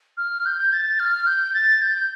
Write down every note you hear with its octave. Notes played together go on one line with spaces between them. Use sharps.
F6
G6
A6
F6
G6
A6
G6